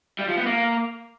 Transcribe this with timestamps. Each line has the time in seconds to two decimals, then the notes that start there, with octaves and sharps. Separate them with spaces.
0.19 G3
0.28 F3
0.37 B3
0.46 A#3